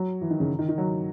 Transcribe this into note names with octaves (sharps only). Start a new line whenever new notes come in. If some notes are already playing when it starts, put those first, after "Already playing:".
Already playing: F#3
E3
D#3
C#3
D#3
D#3
F#3